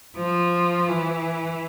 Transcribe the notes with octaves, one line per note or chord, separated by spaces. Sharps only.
F3
E3